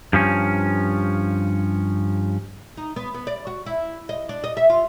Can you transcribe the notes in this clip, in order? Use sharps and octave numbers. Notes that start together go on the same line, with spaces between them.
G2 F3 C#4
D#4
B3
B3
D5
F#4
E4
D#5
D4
D#5
E5
F4